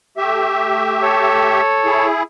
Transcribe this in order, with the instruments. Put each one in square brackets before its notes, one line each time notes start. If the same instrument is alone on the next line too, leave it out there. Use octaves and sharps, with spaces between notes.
[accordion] A3 G4 E5
[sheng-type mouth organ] A4 C#5
[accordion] E4 G#4